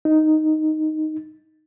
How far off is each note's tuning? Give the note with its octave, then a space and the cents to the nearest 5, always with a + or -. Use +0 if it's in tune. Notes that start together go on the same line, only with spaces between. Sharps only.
D#4 +0